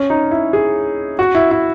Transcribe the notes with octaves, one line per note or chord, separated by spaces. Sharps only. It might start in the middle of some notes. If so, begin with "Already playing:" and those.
Already playing: C#4
D#4
E4
G#4
F#4
E4
E4